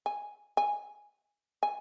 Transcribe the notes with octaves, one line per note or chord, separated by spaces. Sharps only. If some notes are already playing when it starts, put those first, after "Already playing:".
G#5
G#5
G#5